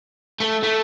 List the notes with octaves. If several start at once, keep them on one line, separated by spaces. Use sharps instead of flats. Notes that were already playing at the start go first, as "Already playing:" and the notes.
A3
A3